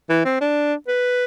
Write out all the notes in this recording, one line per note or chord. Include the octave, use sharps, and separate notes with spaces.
E3
C4
D4
B4